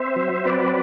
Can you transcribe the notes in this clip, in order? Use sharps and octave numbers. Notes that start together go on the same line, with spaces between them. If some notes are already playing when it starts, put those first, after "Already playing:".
Already playing: C4 C5 E5
F#3
C4 B4 D5